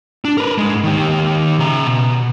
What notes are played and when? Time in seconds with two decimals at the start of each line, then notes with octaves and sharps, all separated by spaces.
0.25 D4
0.38 A#4 B4
0.58 G#2 G#3
0.83 D#3 G4
1.59 C#3 A#5
1.87 B2